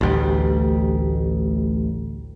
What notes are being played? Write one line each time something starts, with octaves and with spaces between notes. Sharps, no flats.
A1 D2 G3